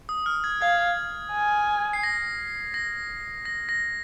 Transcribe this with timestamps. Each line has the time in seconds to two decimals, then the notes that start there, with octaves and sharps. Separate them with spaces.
0.09 D#6
0.26 F6
0.44 G#6
0.61 F5 G#6
1.33 G#5
1.93 C7
2.03 A#6
2.74 A#6
3.45 A#6
3.69 A#6